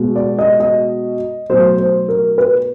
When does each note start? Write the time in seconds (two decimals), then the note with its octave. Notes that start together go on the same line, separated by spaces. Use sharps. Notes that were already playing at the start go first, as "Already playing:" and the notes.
Already playing: B2 G#3
0.16 D5
0.39 D#5
0.60 D#5
1.50 B2 F#3 A3 C5
1.78 C5
2.08 A#4
2.38 B4